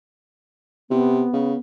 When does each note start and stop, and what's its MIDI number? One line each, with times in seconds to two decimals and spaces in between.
0.90 1.25 48
0.90 1.59 59
1.33 1.55 49